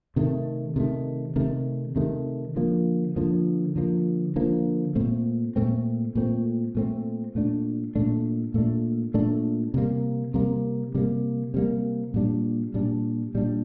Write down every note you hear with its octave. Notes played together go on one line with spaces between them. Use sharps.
C3 D#3 A3
C3 D#3 A3
C3 D#3 A3
C3 D#3 A3
D3 F3 A#3
D3 F3 A#3
D3 F3 A#3
D3 F3 A#3
A#2 A3 C4
A#2 A3 C4
A#2 A3 C4
A#2 A3 C4
A#2 A3 D4
A#2 A3 D4
A#2 A3 D4
A#2 A3 D4
C3 G3 A#3
C3 G3 A#3
C3 G3 A#3
C3 G3 A#3
A#2 G3 D4
A#2 G3 D4
A#2 G3 D4